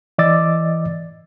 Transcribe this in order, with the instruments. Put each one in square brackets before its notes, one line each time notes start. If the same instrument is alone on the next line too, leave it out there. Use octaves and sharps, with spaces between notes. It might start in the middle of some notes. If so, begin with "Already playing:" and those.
[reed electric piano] E3 D5 D#5 D6 E6 A6